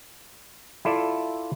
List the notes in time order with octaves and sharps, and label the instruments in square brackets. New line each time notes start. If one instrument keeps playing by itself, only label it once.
[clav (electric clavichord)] E4 F4 A4 D5 E5